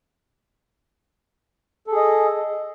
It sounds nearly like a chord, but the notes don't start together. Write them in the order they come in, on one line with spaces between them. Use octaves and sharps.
A4 G#4 D#5